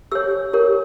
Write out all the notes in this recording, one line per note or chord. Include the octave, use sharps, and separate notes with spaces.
G4 C#5 E6
G4 A#4 C#5